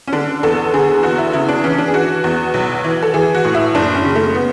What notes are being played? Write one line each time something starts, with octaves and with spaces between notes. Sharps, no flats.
C#4
D3 D4
E2 A4
D3 G#4
G#4
E2 F#4
E4
C#3 E4
D4
E3 C#4
D4
G#4
E3 F#4
E2
B1
E3
A4
E3 G#4
F#4
A2
E4
F#1 D4
C#4
C#3
A3
B3